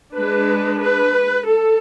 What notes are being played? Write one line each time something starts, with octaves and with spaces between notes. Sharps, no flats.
G#3 D4 B4
B4
A4